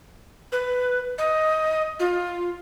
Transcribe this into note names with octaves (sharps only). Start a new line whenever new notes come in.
B4
D#5
F4